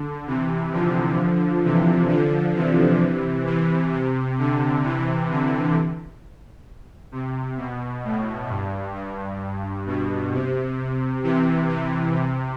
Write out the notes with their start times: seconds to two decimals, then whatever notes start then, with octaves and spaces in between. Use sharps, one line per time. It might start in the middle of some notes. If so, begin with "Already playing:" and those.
Already playing: D3
0.27 C3 E3
0.72 D3 F3
1.64 C3 E3
2.09 D3 F3
2.55 C3 E3
3.47 C3 E3
3.93 C3
4.38 D3
4.83 C3 E3
5.30 D3
7.12 C3
7.57 B2
8.04 A2
8.49 G2
8.95 G2
9.86 B2
10.33 C3
11.23 C3 E3
11.69 C3 E3
12.16 C3